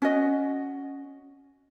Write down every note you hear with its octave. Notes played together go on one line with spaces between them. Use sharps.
C#4 F#4 D#5